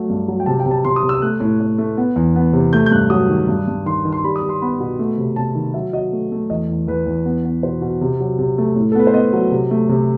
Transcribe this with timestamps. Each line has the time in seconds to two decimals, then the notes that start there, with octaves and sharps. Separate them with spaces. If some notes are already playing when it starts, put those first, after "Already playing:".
Already playing: F#3 A3
0.09 G2
0.28 F#3
0.40 G5
0.46 C3 A5
0.60 G5
0.66 C3
0.71 A5
0.85 C3 C6
0.96 D#6
1.03 C3
1.09 E6
1.22 A3 F#6
1.40 A2
1.60 A2
1.78 A3
1.97 B3
2.16 E2
2.36 B3
2.53 C3
2.73 A3 G6
2.86 G6
2.91 G2 F#6
3.10 F#3 D#6
3.29 D#3
3.49 G2
3.68 G2
3.86 D#3 C6
4.05 D#3
4.12 C6
4.24 G3 B5
4.36 D#6
4.43 G3
4.49 C6
4.62 B3 B5
4.80 B2
4.99 A3
5.18 C3
5.36 C3 A5
5.55 D#3
5.74 F#3 E5
5.93 F#3 D#5
6.12 A3
6.32 A3
6.50 E2 D#5
6.69 E2
6.88 E2 B4
7.06 E2
7.25 B3
7.44 B3
7.63 B2 C5
7.81 B2
8.01 C3
8.20 F#3
8.39 C3
8.58 A3
8.76 A2
8.92 A4
8.95 B3 B4
9.07 C5
9.14 B3 D#5
9.33 F#3
9.52 C3
9.71 A3
9.89 C3